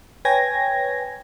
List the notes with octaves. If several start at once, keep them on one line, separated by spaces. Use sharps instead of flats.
B4 C#5 G5 G#5 G#6 A#6